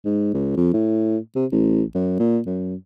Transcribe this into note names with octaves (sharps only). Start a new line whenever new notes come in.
G#2
C#2
F2
A2
C3
A1
F#2
A#2
F#2